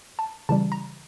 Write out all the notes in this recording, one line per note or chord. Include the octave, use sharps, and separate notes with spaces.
A5
C#3 E3 G3 A5
A#5